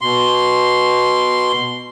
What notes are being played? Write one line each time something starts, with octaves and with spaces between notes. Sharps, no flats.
B2 C6